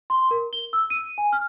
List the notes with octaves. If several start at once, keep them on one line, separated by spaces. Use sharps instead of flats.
C6
A#4
G7
E6
D#7
G#5
F6